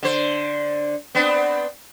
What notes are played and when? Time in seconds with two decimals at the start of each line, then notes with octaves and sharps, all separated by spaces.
0.03 D3 C5
1.15 B3 C4 D4